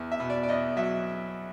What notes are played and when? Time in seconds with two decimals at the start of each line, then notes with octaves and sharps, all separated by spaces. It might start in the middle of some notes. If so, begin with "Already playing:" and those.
Already playing: E2
0.12 E5
0.20 B2
0.30 D5
0.43 D5
0.49 E2 D#5
0.77 F#3 E5